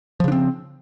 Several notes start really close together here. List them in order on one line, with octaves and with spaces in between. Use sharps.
F3 C#3 D4 C4